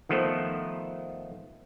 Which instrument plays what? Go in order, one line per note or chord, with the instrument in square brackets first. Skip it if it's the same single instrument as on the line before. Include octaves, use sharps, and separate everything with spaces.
[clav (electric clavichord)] D#3 F3 A3 B3 A4 C5